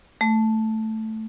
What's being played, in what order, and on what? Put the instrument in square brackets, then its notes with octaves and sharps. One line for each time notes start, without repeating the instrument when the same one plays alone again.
[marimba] A3